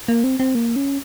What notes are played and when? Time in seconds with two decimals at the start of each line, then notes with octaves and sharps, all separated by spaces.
0.08 A#3
0.24 C4
0.40 C4
0.55 A#3
0.76 C#4